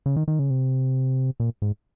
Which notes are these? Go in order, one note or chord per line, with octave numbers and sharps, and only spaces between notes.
C#3
D#3
D#3
C#3
C3
A#2
G#2